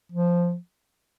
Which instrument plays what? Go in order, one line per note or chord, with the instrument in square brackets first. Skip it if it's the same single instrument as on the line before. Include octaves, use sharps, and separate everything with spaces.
[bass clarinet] F3